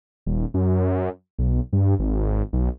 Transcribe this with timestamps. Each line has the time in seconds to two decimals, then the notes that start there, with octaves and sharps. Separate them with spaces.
0.26 D#1
0.54 F#2
1.39 B1
1.73 G2
1.99 G#1
2.53 B1